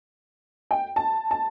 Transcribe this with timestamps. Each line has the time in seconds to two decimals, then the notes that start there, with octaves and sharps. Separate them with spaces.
0.71 G5
0.96 A5
1.31 A5